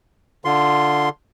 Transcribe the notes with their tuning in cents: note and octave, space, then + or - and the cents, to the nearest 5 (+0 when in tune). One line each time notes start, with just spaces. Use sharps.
D3 +0 F4 +0 C6 +0